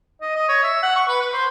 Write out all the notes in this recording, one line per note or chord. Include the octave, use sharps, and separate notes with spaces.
D#5
D#5
C#5
E5
F#5
C#6
B4
B4
C5